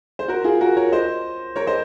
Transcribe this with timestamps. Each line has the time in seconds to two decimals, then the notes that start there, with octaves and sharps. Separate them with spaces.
0.19 C5
0.28 F#4 A#4
0.44 F4 G#4
0.61 F#4 A#4
0.77 A#4 C#5
0.92 C5 D#5
1.56 A#4 C#5
1.67 C5 D#5